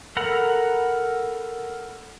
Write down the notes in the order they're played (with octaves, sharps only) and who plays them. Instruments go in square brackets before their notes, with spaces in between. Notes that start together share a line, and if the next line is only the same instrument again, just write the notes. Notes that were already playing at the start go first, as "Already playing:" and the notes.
[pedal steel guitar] A4 A#4 F#5 A#5 B5